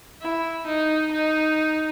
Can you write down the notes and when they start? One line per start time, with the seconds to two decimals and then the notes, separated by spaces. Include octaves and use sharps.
0.21 E4
0.66 D#4
1.11 D#4